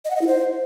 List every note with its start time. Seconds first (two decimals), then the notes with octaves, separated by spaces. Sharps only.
0.05 D#5
0.10 F#5
0.16 D#5
0.21 E4
0.27 C5